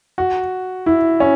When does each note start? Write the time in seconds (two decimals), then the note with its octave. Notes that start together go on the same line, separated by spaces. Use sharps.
0.18 F#4
0.86 E4
1.20 C#4